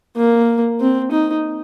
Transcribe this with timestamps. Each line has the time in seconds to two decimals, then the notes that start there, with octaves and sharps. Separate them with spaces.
0.17 A#3
0.80 C4
1.11 D#4